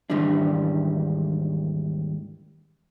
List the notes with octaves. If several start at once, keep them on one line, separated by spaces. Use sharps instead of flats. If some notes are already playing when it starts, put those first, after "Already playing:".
D#2 G#2 C#3 E3 G3 D4